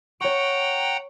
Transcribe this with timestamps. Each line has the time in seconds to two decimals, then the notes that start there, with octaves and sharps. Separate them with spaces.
0.21 C#5 F#5 G5 A#5 C#6